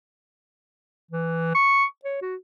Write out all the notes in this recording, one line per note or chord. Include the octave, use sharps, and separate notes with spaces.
E3
C#6
C#5
F#4